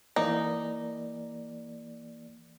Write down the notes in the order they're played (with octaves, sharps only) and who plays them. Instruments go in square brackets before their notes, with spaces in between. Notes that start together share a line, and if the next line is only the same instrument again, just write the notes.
[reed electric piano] E3 A#3 D5 [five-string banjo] D#4